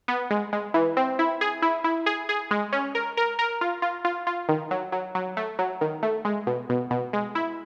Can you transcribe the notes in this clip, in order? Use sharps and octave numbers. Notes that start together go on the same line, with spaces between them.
B3
G#3
G#3
E3
C4
E4
G#4
E4
E4
G#4
G#4
G#3
C#4
A#4
A#4
A#4
F4
F4
F4
F4
D#3
F#3
F#3
F#3
A3
F#3
D#3
A3
G#3
B2
B2
B2
G#3
E4